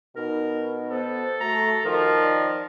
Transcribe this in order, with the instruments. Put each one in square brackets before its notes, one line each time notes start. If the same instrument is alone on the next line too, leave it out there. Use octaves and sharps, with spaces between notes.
[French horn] B2 [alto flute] D#4 [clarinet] A#4
[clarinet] B3 [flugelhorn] A4 [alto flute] C5
[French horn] A3 [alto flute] F#4 [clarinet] A#5
[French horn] D#3 [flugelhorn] F3 [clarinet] A#4
[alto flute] D5